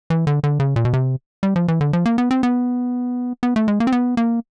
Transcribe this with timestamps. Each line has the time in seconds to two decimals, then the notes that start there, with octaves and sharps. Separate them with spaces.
0.10 E3
0.27 D3
0.44 D3
0.60 C#3
0.76 A#2
0.85 B2
0.93 C3
1.43 G3
1.56 F3
1.68 E3
1.81 D3
1.93 F3
2.06 A#3
2.18 B3
2.31 C4
2.43 B3
3.43 B3
3.56 A3
3.68 G#3
3.80 A#3
3.87 C4
3.92 B3
4.17 A#3